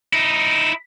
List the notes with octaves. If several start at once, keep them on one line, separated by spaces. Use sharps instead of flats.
D#4 E4